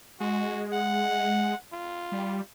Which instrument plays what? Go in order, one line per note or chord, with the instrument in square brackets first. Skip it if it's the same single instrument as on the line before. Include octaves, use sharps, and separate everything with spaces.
[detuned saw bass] G#3 [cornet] F#4
[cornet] F#5
F4
[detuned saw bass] G3